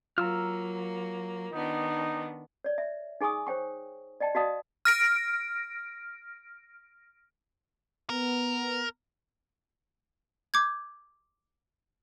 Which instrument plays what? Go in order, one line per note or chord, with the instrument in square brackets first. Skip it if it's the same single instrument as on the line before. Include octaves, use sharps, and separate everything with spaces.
[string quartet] F#3 A#3 [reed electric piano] F4 [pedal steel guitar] A#5 E6 F6
[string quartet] D#3 B3 D4 [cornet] D#4
[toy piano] C#5 D5
E5
D#4 G#4 G#5 C#6 D#6
C5 C#5 G5 C#6
D5 D#5 G5 A5
F#4 D5 D#5 F5 A5 D#6
[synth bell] F6 A#6 D7
[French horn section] B3 [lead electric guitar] A#4
[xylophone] D6 G6 G#6